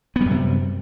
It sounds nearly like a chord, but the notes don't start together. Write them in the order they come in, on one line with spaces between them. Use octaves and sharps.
B3 G3 F#2 C3